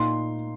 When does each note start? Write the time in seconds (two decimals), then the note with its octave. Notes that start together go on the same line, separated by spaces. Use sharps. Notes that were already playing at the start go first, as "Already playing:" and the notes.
Already playing: A#2 A#3 D#4 C6